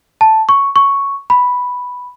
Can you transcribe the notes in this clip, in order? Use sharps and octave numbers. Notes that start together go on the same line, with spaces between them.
A5
C#6
C#6
B5